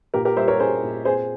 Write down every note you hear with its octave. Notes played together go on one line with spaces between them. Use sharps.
A#2 G4 A#4
G4 A#4
G3 C5 E5
A#4 C#5
C#4 G#4 C5
A#2
C4 G#4 C5